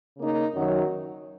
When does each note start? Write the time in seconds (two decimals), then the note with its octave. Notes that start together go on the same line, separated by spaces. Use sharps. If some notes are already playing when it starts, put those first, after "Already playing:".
0.18 C#3 A#3 D#4
0.54 F#2 D#3 F#3